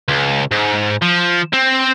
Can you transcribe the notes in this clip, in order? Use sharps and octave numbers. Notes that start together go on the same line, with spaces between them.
C#2
G#2
F3
C4